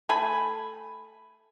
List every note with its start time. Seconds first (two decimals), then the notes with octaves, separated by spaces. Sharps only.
0.09 A3 G#5 B5